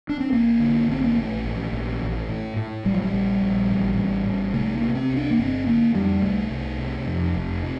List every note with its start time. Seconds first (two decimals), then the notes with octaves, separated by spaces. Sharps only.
0.09 D4
0.20 C4
0.32 A1 A#3
0.60 D3
0.88 A1 C4
1.04 A#3
1.16 A#1 A3
1.44 A#1
1.73 A#1
2.01 A1
2.29 A2
2.56 A2
2.85 A#1 G3
2.93 F3
3.02 G3
3.13 A#1
3.42 A#1
3.70 A1
3.98 A1
4.26 A1
4.54 C3 A3
4.75 A#3
4.82 C3
4.95 C4
5.10 C2
5.16 D4
5.31 A#3
5.38 G1 C4
5.66 D3 A#3
5.94 F2 G3
6.22 C2 A3
6.51 C2
6.78 C3
7.07 F2
7.35 F1
7.63 C3